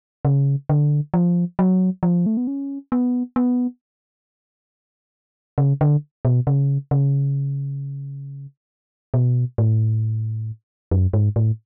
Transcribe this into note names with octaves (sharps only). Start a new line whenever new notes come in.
C#3
D3
F3
F#3
F3
A3
B3
C#4
B3
B3
C#3
D3
B2
C#3
C#3
B2
A2
F#2
G#2
A2